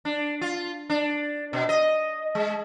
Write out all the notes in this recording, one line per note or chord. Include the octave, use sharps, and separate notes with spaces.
D4
F4
D4
B2
D#5
G#3